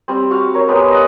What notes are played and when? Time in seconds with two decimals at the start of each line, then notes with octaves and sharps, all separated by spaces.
0.08 G3 C4
0.31 F#4 F5
0.54 A#4 C#5
0.68 G#3 B3 G4 A#4
0.92 D#5 F#5